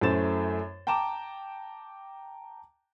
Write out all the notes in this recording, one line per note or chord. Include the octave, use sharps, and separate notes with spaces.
F#2 A3 E4 C5 A6 E7
G5 A5 A#5 D6 E7